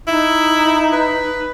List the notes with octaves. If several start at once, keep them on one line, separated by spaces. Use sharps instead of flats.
D#4 E4
B4